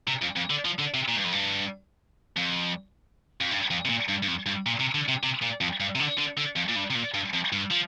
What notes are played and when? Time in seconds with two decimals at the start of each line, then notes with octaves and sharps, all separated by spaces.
0.08 C3
0.22 F2
0.36 F2
0.50 D3
0.65 F3
0.79 D3
0.94 C3
1.08 A#2
1.16 G2
1.24 F2
1.33 G2
2.37 F2
3.41 F2
3.51 G2
3.71 F2
3.85 C3
3.89 A#2
4.09 G2
4.23 G2
4.28 F2
4.46 G2
4.66 A#2
4.80 C3
4.94 D3
5.08 C3
5.23 C3
5.42 A#2
5.61 F2
5.80 G2
5.95 C3
6.00 D3
6.18 D3
6.38 D3
6.56 F2
6.69 A#2
6.76 G2
6.90 C3
6.95 A#2
7.14 G2
7.33 F2
7.52 G2
7.71 F3